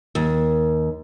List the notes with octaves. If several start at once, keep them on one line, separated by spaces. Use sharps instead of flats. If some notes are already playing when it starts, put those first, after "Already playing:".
D#2